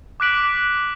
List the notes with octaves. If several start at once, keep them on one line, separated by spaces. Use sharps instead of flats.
D6 F#6 B6 D7 F#7